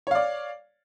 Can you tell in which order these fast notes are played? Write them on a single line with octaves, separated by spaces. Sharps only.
C#5 F5 D5